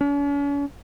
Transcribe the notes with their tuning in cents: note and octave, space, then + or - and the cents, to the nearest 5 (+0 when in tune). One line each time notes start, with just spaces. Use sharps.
C#4 +45